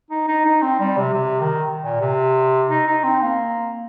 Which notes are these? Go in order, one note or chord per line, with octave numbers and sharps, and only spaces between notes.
D#4
D#4
D#4
C4
G3
C3
C3
D#3
A#2
C3
D#4
D#4
C4
A#3